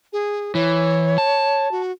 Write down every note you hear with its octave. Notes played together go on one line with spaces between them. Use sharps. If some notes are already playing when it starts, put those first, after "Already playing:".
G#4
E3 C#5
A5
F#4